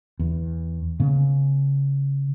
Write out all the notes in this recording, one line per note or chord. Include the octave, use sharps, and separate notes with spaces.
E2
C#3 B3